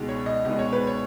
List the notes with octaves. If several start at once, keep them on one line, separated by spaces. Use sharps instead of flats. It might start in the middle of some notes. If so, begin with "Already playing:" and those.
Already playing: C#2 B2 G#3 D#4
C#5
D#5
C#2 B2 G#3 D#4 D#5
C#5
B4
C#5